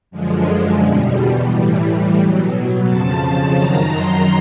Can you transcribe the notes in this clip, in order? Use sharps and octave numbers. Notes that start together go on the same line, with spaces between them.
F#2 D3 F3 G#3
E2 B2 G3
A2 E3 G3
B2 F#3
F2 C#3 F3 A5
A5
F#2 D#3 F#3 A#5
C6